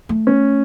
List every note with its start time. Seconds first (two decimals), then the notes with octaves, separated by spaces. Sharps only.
0.09 A3
0.27 C#4